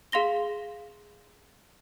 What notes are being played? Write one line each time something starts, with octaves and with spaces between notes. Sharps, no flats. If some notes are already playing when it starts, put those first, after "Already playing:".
G#4 F5 C6 A#6 G7